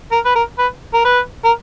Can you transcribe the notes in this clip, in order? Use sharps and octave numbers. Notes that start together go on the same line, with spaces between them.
A#4
B4
A#4
B4
A#4
B4
A#4